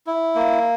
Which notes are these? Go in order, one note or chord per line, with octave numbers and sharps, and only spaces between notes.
E4
A#3